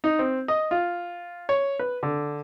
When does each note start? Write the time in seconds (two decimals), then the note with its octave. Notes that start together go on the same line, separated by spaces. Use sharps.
0.04 D#4
0.19 C4
0.48 D#5
0.71 F4
1.49 C#5
1.79 B4
2.03 D3